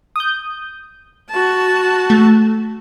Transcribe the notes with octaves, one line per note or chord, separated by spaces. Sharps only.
D#6 G6
F#4 A5
A3